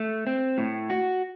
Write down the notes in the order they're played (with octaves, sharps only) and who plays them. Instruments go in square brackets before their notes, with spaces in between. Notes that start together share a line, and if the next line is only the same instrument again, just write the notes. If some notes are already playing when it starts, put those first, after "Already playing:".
Already playing: [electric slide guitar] A3
C4
A2
F#4